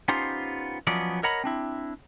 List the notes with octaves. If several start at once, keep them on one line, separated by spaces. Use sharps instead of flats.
B3 C#4 D#4 F4 G4 C5
F3 F#3 B3 C#4 D5 D#5
A#4 C#5 D#5 F#5 A#5 B5
C4 D4 E4